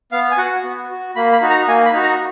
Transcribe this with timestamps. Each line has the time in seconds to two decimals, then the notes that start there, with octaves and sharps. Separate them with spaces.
0.12 B3 F5
0.31 G#5
0.38 F#4 F#5
0.64 B3
0.90 F#4
1.16 A#3 B5
1.33 B5
1.42 D#4 F#4
1.50 A#5
1.68 A#3 G#5
1.86 B5
1.93 D#4 F#4
2.02 A#5